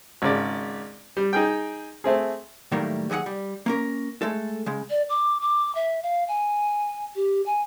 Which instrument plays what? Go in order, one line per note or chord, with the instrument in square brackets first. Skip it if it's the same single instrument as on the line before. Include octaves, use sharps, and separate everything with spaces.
[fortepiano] G#1 C#3 D5
G3
D#4 G#4 G5
A3 C4 G#4
[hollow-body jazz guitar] A2 D#3 F#3 G3 A3 A#3
D#2 F#3 G#4 D#5 F#5
G3
A#3 C#4 A#4
G#3 A3 A4
C#3 G#3
[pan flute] D5
D6
D6
E5
F5
G#5
G4
G#5